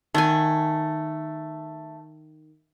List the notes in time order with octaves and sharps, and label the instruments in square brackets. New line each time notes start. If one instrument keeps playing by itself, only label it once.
[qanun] D#3 G#5 [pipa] A3